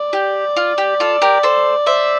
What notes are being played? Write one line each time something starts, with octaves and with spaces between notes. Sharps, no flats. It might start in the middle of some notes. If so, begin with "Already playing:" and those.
Already playing: D5
G4
F4
G4
F4 A4
G4 A#4
A4 C5
C5 E5